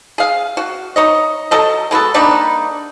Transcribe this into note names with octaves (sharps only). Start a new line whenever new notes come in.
G#4 F5
F#4
D#4 C#5 D#5
F#3 A4 D#5
G#3 B3 F#4 A4
G3 A#3 D4 D#4